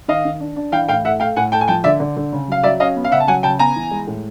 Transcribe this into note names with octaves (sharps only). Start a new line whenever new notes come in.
D#3 D#5 F5
D#3
D4
D4
E3 F5 G5
A2 F5 G5
A3 E5 F#5
A3 F5 G5
A2 F#5 G#5
A3 G5 A5
G#5
F3 G5 A5
D3 D5 E5
D3
D3
C#3
F#3 F5
F#3 D5 E5
C#4 D#5 F5
B3
F5
C#3 E5 F#5
A5
F#3 F#5 G#5
C#3 G5 A5
B3 G#5 A#5
E3
G#3
A2